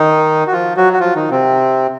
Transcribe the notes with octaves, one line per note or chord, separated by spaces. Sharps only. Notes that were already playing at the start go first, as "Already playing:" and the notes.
Already playing: D#3 D#4
F#4
F3 F4
F#3 F#4
F#4
F3 F4
D#3 D#4
C3 C4